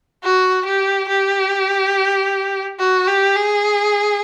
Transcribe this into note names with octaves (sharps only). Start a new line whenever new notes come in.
F#4
G4
G4
F#4
G4
G#4